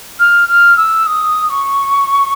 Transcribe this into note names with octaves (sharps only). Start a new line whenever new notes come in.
F6
F6
E6
D#6
C#6